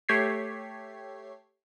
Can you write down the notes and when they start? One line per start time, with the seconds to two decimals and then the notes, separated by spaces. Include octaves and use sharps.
0.09 A3 G4 C#5 G#6 B6 C7